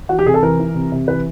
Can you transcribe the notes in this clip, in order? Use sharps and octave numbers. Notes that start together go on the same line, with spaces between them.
E3 F#4
G4
C3 G#4
A4
E3 A#4
E3
C3
C3
E3 B4